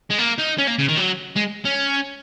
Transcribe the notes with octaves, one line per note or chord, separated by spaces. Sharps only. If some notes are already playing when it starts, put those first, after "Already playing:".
G#3
A#3
D#4
C#4
A#3
C#3
D#3
F#3
G#3
C#4